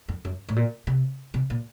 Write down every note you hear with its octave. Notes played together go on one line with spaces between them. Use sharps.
F2
F#2
A2
A#2
C3
C3
A#2